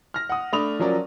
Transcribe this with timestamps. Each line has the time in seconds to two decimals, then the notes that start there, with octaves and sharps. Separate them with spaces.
0.14 F6 A#6
0.29 F#5 D#6
0.53 A3 D4 B5 D#6 F7
0.79 F3 F#3 C#4 A#4 D5